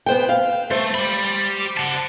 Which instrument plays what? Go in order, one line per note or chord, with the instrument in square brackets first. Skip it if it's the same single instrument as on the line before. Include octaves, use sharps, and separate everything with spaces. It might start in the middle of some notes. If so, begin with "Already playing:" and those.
[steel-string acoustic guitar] B3 C5 G5
F5
[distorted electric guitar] A3 [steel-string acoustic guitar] C5
[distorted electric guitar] G4 B5
F#5 A5